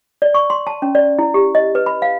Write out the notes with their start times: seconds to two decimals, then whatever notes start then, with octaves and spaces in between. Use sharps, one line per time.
0.22 D5
0.34 C#6
0.50 C6
0.67 A5
0.82 C#4
0.95 D5
1.19 E4
1.34 G4
1.55 D#5
1.75 B4
1.86 B5
2.02 F5